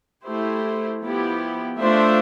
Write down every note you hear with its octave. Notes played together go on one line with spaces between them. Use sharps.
A3 E4 G4 C5
F3 B3 E4 G4
A3 D4 F4 C5 E5